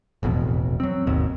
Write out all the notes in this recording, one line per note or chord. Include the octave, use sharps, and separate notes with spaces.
E1 A1 F2 B2
F#3 C4
G#1 D#2 B2